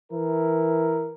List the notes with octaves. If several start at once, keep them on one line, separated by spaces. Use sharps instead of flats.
E3 E4 A#4